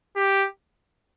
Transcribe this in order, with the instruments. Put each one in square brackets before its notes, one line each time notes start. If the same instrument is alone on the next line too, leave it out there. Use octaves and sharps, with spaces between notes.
[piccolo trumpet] G4